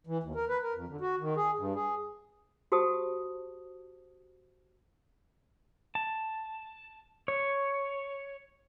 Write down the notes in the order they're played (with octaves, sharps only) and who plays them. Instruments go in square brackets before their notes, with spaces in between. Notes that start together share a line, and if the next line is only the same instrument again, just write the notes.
[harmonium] E3
D#2
A#4
B4
A#4
F2
D3
F#4
D#3
G#4
G2
G#4
[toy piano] F#4 G4 C5 A5 D#6
[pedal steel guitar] A5
C#5